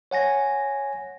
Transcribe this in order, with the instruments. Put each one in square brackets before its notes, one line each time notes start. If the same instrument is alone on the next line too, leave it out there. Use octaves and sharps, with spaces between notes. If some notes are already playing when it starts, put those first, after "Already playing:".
[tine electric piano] C#5 F#5 G#5 A#6